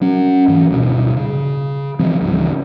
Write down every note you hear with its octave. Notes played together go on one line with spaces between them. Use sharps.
F#3 C#4
G#2 E3
D1 G2 B2
C#3
E3 F3 G3 C4
C#2 G#2 C#3 E3